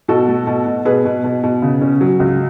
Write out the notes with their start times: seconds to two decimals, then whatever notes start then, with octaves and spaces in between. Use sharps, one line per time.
0.08 B2 F#4 A4
0.28 A3
0.47 B2
0.66 B2
0.85 B2 G#4 B4
1.05 B2
1.24 B2
1.43 B2
1.62 C#3
1.81 C#4
2.01 F#3
2.20 C#2